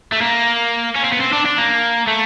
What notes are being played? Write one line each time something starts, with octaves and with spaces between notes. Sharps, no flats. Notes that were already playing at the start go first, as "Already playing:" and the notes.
A3
A#3
C#4
C4
B3
C4
D4
D4
A#3
A3